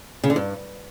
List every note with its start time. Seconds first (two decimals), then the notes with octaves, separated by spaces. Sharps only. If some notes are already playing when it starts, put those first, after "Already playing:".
0.24 C#3
0.30 D3
0.36 G2